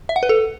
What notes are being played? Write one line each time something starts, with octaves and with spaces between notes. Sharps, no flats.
E5
F#5
B4
A4